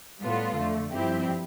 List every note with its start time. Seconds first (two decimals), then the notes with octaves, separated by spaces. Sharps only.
0.22 A2 G3 B3 F4 A4
0.56 F2 D3 A3
0.91 G2 F3 C4 E4 G4